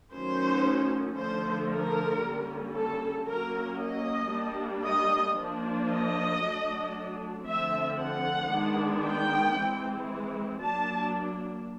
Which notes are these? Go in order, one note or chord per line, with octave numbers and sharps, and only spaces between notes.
D#3 F#3 A3 C#4 C5
D3 F3 A3 C5
A#4
D3 G3 A#3 C#4
A4
F#3 A#3 C#4 A#4
D#5
G3 A#3 D4
D#5
F3 A#3 D4
D#5
F#3 A3 D4
D3 F3 A3 C4 E5
F#5
D#3 G#3 B3 D4
G5
E3 G#3 C4
F#3 A#3 D4 A5